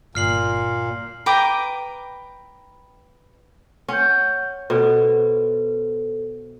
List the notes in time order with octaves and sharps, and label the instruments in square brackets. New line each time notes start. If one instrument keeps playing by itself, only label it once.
[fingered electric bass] G1 [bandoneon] A#2 [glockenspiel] F6 C7 F#7
[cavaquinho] B4 G5 A#5 D6
[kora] C#4 [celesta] F#5 G6
[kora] B2 [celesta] A4 C5